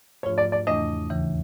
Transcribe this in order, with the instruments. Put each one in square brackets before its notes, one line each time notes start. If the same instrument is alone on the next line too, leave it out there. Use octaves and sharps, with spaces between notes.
[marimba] G#2 F3 A3 D4 F4 [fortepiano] C#5
[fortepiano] D5
D5
[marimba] E2 C#3 E3 A3 D4 [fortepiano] D#5
[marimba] D#2 C#3 E3